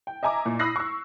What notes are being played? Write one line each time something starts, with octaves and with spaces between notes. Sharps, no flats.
G5
D#5 E5 G#5 A#5 D6
A#2
B5 D#6 E6 F#6 A#6 C7
C#6 E6